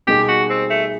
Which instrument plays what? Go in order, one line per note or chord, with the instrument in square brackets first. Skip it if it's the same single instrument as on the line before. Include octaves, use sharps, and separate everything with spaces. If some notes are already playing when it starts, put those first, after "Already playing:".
[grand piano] B2 G3 A#3 D#4 G#4 [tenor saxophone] G4
[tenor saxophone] F#4
C4
A3